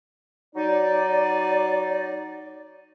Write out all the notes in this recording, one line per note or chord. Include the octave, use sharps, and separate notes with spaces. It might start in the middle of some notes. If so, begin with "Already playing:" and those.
F#3 D#4 D5